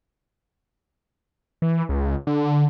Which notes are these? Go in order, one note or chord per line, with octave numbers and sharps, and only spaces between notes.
E3
C#2
D3